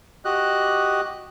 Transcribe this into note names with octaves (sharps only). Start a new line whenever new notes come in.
F#4 G4 D#5 F#6